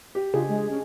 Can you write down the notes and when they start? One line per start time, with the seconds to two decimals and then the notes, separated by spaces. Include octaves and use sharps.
0.15 G4
0.34 C#3 D4 F4 G#4 D#5
0.48 G#3
0.70 C#4